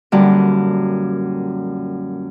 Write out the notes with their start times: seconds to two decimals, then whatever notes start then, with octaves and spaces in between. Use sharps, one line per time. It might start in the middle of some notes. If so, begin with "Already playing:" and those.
0.12 F#2 A#2 D3 G3